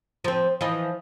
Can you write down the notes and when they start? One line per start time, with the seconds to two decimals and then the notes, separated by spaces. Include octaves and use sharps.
0.24 F3 C4
0.61 E3 F3 D#5